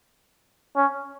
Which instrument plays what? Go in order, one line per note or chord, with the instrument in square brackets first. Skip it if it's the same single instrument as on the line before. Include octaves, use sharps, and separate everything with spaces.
[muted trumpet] C#4